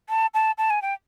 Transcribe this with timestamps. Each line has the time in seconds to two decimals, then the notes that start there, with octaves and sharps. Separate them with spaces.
0.09 A5
0.34 A5
0.58 A5
0.70 G#5
0.82 G5